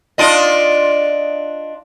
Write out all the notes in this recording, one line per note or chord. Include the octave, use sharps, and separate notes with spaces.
D4 F4 D#5